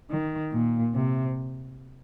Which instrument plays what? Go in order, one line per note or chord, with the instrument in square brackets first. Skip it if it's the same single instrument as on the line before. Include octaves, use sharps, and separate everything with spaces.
[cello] D#3
A#2
C3